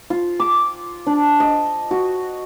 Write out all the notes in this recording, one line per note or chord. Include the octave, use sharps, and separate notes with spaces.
F4
D6
D4
D#5
F#4